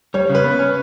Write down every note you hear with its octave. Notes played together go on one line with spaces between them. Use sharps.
G3 C#5
C#3
B4
B3
C#4